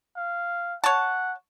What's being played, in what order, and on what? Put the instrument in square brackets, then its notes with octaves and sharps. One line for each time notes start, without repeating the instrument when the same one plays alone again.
[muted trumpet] F5
[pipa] C#5 A5 [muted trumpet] F#5